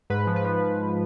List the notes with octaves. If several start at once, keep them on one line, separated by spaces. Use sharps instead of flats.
G#2 B4
F3
B4
F3